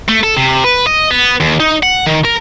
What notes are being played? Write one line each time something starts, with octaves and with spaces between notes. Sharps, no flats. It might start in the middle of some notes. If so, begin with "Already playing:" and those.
A3
A4
C3
B4
D#5
B3
D#2
D#4
F#5
D#3
A#4